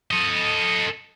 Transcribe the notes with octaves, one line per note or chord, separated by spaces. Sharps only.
A4 D#5